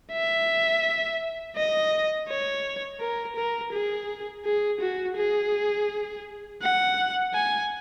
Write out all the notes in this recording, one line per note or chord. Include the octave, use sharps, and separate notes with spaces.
E5
D#5
C#5
A#4
A#4
G#4
G#4
F#4
G#4
F#5
G#5